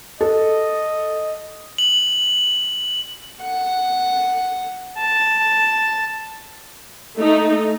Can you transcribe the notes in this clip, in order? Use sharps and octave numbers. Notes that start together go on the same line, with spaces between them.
A4 D#5
F#7
F#5
A5
A3 D#4